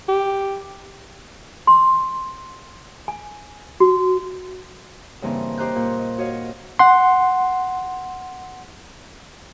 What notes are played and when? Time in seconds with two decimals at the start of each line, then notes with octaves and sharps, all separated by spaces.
0.09 G4
1.67 C6
3.08 G#5
3.80 F#4
5.22 G2 C#3 E3 A#3 C4 D#4
5.57 G4 C5 D#5 A#5 F#6 G6
5.76 A#2
5.99 D#5
6.18 F#4 C#5 D#5 F5
6.79 F#5 C6